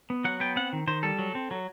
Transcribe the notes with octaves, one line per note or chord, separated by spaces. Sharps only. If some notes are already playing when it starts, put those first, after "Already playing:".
B3
F#3 F#5
B3 G5
C4 F#5
D#3
D#3 C5
G3 A4
F#3
C4
F#3